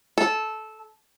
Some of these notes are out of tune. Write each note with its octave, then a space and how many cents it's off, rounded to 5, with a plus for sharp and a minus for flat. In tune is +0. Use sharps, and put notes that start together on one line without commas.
A4 -15